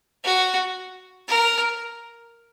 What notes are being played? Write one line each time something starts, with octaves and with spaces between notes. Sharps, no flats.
F#4
A#4